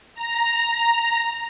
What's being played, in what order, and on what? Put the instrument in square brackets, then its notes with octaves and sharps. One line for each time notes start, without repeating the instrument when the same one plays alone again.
[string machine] A#5